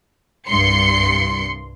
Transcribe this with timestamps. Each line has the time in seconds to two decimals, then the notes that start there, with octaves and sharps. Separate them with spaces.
0.48 C2 G2 C6 C#7